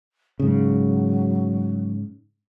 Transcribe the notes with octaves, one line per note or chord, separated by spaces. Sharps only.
G#2 C#3 F#3